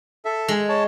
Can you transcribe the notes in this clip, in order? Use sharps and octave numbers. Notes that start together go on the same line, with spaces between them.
A4 E5
G#3
C#5 A5